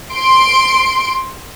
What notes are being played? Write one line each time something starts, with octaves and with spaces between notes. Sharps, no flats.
C6 D7